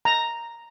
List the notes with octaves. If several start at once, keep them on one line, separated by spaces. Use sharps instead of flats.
A#5